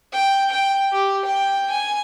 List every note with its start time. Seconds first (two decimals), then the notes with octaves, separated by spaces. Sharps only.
0.13 G5
0.50 G5
0.92 G4
1.26 G5
1.71 G#5